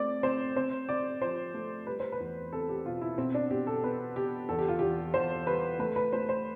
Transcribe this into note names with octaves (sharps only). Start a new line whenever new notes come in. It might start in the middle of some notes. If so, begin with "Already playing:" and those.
Already playing: A3 C4 D5
C4 C5
C4 C5
C4 D5
F3 C5
A3
G3 B4
C5
B4
E2
C4 A4
G4
B2 F4
E4
B2 C4
D4
B2 G4
A4
B3 B4
B3 G4
E2 A4
G4
F4
E2 G4
E2 C5
G3 B4
A3 B4
B4
A3 C5
C5